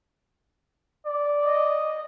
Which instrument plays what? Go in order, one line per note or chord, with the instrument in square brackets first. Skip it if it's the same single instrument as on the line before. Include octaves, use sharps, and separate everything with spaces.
[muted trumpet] D5
[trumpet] D#5